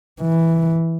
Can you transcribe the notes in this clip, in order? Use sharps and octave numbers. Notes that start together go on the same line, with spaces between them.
E3